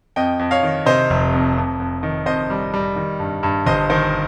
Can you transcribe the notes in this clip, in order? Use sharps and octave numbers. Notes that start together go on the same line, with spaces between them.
F2 D#5 G5
F2
C#5 F5
D#3
C3 C5 D#5
F1
F2
F2
F2
D#3
F2 C5 D#5
G3
G3
D#3
G2
G2
G1 C5 D#5
D#3 C5